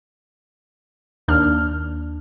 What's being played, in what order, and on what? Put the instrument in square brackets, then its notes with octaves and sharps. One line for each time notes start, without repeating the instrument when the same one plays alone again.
[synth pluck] D#2 D4 F6